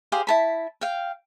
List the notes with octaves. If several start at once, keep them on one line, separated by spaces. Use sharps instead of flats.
G4 G#4 C5 F5
E4 A5 B5
F5 G5